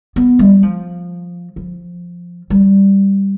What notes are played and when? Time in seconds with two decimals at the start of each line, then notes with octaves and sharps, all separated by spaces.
0.16 B3
0.39 G3
0.63 F3
1.56 F3
2.50 G3